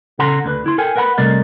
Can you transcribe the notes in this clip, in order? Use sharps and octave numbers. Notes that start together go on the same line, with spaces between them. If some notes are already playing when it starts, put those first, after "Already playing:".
C#3 A4 F#5 A#5 C6
D2 D3 B4
E4 C6
A4 A#4 G5 G#5
A#4 B4 F#5 A#5 B5
C2 C3 A3 A#4 D5 D#5